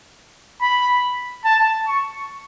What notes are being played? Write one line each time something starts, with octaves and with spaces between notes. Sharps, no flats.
B5
A5
C#6